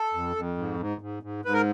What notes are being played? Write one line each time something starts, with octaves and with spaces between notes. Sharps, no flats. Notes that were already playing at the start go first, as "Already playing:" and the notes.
Already playing: A4
F2
F2
G#2
G#2
G#2
G#2
G#2 B4
A#4